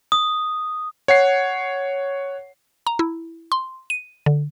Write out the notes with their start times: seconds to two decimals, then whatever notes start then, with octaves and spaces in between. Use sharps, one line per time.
0.12 D#6
1.08 C#5 F#5 C7
2.87 A#5
2.99 E4
3.52 C6
3.90 D#7
4.26 D3